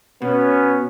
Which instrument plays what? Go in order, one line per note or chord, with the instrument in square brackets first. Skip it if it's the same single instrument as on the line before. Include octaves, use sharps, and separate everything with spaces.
[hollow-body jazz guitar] B2 [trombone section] B3 C#4